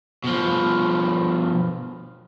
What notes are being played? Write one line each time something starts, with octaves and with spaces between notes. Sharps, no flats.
B2 F3